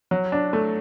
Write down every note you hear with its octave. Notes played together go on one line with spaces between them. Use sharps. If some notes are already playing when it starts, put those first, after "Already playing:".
F#3
D4
A3